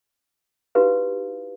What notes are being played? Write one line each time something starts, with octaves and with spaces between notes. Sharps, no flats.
D#4 E4 F#4 G4 B4 F5